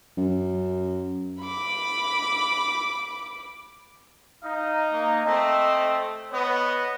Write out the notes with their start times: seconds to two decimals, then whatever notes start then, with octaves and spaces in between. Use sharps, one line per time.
0.18 F#2
1.41 B5 D6
4.43 D#4 F5
4.93 A#3
5.25 A3 C4 D#5
6.31 B3 C#5 D#5